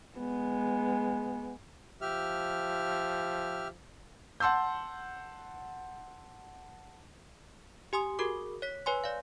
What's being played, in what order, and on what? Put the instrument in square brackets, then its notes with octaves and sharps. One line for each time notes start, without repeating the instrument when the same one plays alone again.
[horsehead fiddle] G#3 B3
[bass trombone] F3 [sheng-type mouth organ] G4 E5 F6
[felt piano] F#5 A5 C6 E6 G6
[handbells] G4 G#5 C6 D#6
F#4 G#4 A#4 D6
C#5 B6
B4 C#5 G#5 C6
D5 F5